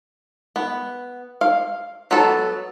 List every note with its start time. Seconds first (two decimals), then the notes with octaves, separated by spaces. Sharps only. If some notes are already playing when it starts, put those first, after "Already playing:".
0.56 B3
1.41 F5
2.11 F#3 B3 A4